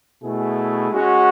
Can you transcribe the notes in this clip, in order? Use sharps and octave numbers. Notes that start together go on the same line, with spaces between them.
B2 A3 E4 G#4
G#3 C#4 F#4